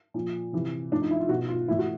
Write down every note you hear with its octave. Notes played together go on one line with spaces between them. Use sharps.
A#2 F3
C3 E3
A2 F3 D4
D#4
E4
F4
B2 F#4
F4
A2 E3 E4
F#4